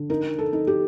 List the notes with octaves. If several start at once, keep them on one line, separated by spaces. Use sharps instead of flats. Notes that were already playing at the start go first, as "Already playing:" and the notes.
Already playing: D3
D#4 A#4
A4
D#4
G4